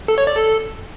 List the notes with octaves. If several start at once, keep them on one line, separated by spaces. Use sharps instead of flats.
A4
C#5
D5
A4